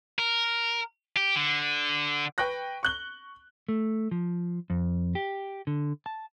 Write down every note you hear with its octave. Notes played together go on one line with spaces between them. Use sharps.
A#4
G4
D3
B4 G5 C#6 F#6 A#6
C#6 F#6 G7
A3
F3
F2
G4
D3
A5